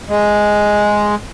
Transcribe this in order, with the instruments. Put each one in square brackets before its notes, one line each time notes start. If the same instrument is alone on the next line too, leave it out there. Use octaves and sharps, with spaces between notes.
[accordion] G#3